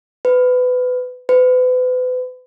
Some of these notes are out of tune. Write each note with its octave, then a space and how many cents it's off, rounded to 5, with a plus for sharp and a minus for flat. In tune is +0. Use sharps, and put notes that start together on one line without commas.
B4 +20
B4 +35